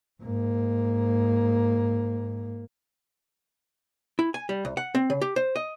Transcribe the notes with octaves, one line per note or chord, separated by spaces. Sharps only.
G#2 A#3
E4
G#5
G3
C2
F#5
C4
C#3
G4
C5
D#5